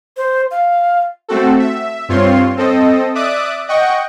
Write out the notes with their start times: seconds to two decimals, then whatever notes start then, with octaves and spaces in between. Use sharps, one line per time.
0.17 C5
0.51 F5
1.29 A3 C4 F#4 A4
1.59 E5
2.09 G2 C4 F4 C#5 C6
2.57 C4 A4 D#5
3.15 D5 E5 D6 D#6 F#6
3.68 D#5 F#5 G5 C#6